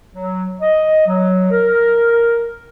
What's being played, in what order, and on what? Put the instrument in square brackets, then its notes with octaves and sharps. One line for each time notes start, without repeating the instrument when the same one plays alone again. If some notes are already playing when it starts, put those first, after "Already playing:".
[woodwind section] F#3
D#5
F#3
A#4